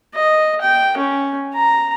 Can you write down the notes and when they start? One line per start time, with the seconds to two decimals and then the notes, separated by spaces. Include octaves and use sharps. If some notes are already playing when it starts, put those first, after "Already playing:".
0.15 D#5
0.62 G5
0.98 C#4
1.55 A#5